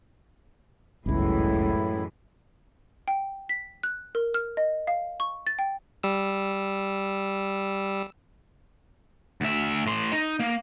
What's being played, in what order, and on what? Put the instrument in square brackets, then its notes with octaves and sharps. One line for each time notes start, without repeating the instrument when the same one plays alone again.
[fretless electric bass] G1 C#2 [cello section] F#2 E3 G#3 [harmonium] A2 E4
[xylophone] G5
B6
F#6
A#4
F6
D#5
F5
C#6
A6
G5
[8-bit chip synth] G3 E6
[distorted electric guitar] D2 E5
A2 C6
D#4
A#3